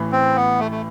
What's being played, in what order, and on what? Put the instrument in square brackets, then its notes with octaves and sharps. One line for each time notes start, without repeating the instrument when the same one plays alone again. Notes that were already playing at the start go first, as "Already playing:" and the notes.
Already playing: [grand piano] A1 A2 E3
[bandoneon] C4
B3
A3
A3